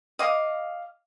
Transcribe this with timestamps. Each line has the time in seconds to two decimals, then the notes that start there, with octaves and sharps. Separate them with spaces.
0.19 D#5 F5 D6